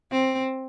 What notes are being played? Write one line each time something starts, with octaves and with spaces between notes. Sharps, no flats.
C4